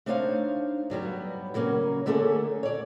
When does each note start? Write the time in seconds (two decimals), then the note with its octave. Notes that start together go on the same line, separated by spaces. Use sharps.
0.06 A3 D4 D#4 C5 C#5 F5
0.90 G2 F#3 G3 B3
1.54 C#3 F#3 A#3 C#4
2.06 D3 A3 A#3 C#4 G#4 A4
2.63 C#5 D5